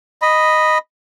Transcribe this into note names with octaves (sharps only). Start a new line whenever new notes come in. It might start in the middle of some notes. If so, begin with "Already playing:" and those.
D#5 B5